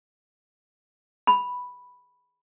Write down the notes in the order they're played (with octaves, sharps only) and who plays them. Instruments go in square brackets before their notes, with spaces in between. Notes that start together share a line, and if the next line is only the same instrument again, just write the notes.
[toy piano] B5